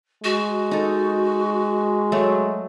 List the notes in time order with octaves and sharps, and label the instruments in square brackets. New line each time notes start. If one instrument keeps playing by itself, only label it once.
[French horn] G#3 [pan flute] F#4
[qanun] D#4 A4
F#3 A3